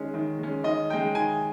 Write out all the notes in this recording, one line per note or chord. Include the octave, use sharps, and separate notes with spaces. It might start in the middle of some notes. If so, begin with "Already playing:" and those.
Already playing: D#3 G#3 C#4
D#3
G#3 C#4
D#3 D#5
G#3 C#4 G5
D#3 G#5